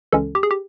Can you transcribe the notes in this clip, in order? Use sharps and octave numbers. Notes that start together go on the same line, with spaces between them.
C#2 C#3 E3 G#3 C#4 A4
G4
G#4
G4